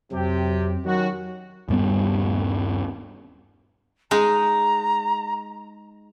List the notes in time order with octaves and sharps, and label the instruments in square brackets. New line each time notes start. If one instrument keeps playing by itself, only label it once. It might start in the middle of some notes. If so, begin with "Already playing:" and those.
[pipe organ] F2 [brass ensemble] C3 G4 [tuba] F#3
[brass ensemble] D#3 C#4 F#4 [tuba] F#3
[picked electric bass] D#1 G2 G3 B3
[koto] G#3 D#4 [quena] A#5